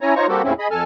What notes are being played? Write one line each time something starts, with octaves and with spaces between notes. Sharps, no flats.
C#4 E4 C#5 G#5 A#5
D#4 F4 C5 C#5 A#5 C#6
G3 A#3 C4 F#4 G4 A4
D#2 A2 C#3 C4 C#4 E4
G#4 D#5 B5
F2 A4 G#5 A5 F6